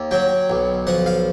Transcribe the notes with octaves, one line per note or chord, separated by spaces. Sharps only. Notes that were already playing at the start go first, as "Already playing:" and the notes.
Already playing: D#2
F#3 G5
B1
F3 F#5
F5